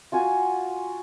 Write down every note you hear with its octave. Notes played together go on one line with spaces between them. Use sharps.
F4 F#4 G#5